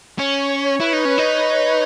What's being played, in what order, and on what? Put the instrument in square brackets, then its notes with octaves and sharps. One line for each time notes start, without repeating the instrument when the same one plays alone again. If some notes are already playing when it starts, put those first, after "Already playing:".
[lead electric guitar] C#4 [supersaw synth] C#5
[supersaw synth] C#5
[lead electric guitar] E4 [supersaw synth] B4
[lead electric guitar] D#4
C#4
[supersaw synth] B4
[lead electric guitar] D#4